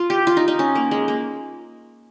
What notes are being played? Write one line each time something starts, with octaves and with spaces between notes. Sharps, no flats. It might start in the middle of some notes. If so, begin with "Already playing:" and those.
Already playing: F4
G4
F4
D#4
D#4
C#4
A#3
G#3
A#3